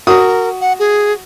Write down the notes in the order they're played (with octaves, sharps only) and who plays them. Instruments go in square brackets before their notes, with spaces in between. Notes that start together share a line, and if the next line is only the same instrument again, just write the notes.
[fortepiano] F#4 D#6 [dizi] A#4
[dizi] F#5
G#4